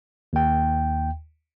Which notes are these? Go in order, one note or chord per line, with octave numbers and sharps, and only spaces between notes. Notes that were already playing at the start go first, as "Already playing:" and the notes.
D#2 G5